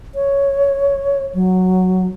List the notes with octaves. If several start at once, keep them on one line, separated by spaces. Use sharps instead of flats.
C#5
F#3